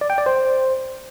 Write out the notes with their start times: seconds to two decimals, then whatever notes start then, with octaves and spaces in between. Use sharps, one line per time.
0.01 D5
0.10 G5
0.18 D5
0.26 C5